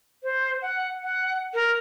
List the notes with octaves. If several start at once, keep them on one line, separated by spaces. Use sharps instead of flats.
C5
F#5
F#5
A#4